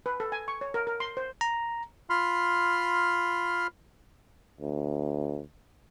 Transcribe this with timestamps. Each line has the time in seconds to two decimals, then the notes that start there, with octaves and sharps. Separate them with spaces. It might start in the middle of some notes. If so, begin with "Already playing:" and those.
0.06 B4
0.20 A4
0.32 G#5
0.48 C#6
0.61 C#5
0.74 A#4
0.87 A#4
1.00 C6
1.17 C5
1.41 A#5
2.10 F4 B5 C6 F6
4.61 D2